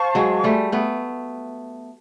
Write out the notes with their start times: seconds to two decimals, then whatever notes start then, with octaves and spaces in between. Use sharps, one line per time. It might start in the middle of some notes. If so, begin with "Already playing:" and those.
Already playing: C5 F5 A5 C#6
0.15 F#3 G#3
0.44 G3 A3
0.72 A3 B3